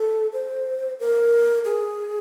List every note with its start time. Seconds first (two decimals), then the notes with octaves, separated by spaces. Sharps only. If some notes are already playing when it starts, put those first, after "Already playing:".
Already playing: A4
0.33 C5
1.00 A#4
1.65 G#4